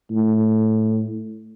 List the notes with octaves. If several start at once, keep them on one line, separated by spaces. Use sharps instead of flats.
A2